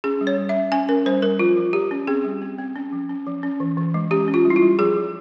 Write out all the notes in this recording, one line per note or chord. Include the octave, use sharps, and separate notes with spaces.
C#4 G#4
G3
C#5
G3
E5
C#4
C#4 G#5
C#4 A#4
G3 C5
G3 A#4
F3 F4
F3
F3 G4
C#4
C4 G#4
G3
C4
C4
C#4
F3
C#4
F3
C#4
E3
E3
G#3
C#4 G4
C#4
F4
G3
E4
F4
G3
F3 G#4
F3